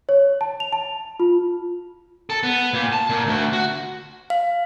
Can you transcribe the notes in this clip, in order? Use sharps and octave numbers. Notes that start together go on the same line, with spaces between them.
C#5
A5
F7
A5
F4
A4
B3
A#2
A5
A#2
D2
F#4
F5